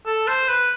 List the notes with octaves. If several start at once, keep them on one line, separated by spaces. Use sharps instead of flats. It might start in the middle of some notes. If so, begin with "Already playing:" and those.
A4
C5
B4